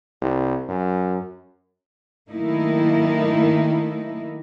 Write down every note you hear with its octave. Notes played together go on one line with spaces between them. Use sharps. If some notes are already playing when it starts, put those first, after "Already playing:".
C2
F#2
D#3 F#3 A3 A#3 D#4 E4